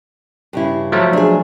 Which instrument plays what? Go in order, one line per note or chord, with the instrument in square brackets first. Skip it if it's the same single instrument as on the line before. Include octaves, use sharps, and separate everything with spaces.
[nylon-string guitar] G2 C#3 E4
[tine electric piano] F3 F#3 A3
[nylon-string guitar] D4 G#4